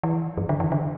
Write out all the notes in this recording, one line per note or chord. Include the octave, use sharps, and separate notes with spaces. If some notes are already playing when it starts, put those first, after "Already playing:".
E3
F#2
D3
E3
D3